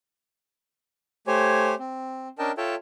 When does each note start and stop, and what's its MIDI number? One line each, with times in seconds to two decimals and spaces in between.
1.27 1.75 57
1.27 1.75 67
1.27 1.75 72
1.27 1.75 73
1.27 1.75 80
1.79 2.28 60
2.39 2.51 61
2.39 2.51 62
2.39 2.51 70
2.39 2.51 75
2.39 2.51 79
2.39 2.51 81
2.57 2.75 65
2.57 2.75 69
2.57 2.75 73
2.57 2.75 76
2.57 2.75 79
2.57 2.75 81